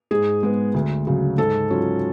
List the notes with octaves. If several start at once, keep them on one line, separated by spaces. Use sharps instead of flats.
G#2 G#4
G#3 B3
D2
C#3 F#3
G#2 A4
F#3 C#4 F4